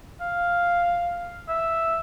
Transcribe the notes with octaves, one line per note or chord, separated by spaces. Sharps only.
F5
E5